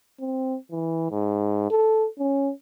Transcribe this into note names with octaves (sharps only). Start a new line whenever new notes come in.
C4
E3
G#2
A4
C#4